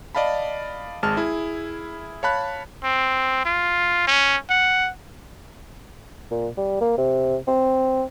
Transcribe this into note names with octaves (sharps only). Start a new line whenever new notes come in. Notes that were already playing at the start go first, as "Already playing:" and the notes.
D5 D#5 F5 A5 B5
G#1 G#3 A5 F6
E4 G#4
C#5 F5 A5 B5 F#6
C4
F4
C#4
F#5
A#2
G3
A#3
C3
C4